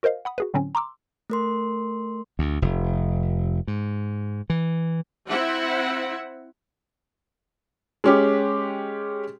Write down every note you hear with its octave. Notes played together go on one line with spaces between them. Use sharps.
F#4 A#4 C5 D#5 F5
F#5 B5 D#6
F#4 G#4 B4
A2 D3 F#3 C4 C#4
A#5 C6 D6 E6
A3 A#4 C6
D2
F1
G#2
E3
C4 E4 E5 F#5
G#3 C#4 G4